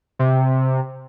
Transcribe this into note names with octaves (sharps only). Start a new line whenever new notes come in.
C3